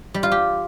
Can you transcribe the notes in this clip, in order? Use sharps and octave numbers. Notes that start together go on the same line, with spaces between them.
G3
F4
G4